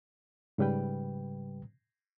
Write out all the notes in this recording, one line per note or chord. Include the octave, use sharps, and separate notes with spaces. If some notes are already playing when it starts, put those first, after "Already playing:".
G#2 C#3 G3 B4 G5